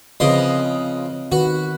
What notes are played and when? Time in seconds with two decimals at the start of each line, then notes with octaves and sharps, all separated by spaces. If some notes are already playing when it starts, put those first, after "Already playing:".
0.20 C#3 F3 C4 B4 D#5 C6
1.32 D#3 F#4 B4